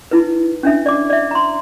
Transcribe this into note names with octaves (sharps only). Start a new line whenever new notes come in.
D#4 E4 B4
C#4 D4 E5
D5 D6
D5 E5
A#5 C6